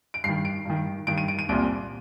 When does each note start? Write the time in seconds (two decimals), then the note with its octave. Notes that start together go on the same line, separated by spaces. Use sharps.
0.14 D7
0.24 G2 D#3 C7
0.45 D7
0.65 G2 D#3
1.07 G2 D#3 D7
1.18 D#7
1.28 D7
1.39 D#7
1.49 C2 A#2 D7